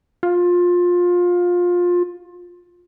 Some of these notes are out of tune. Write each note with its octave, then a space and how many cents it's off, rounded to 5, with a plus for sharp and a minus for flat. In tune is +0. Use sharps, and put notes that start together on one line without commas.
F4 +20